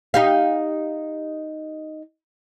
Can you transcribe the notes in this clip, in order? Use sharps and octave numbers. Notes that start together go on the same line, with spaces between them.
D#4 G4 F5